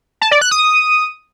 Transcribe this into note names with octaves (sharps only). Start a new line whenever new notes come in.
A5
D5
F#6
D#6